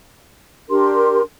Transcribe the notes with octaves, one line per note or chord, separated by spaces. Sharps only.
D4 G4 A#4 C6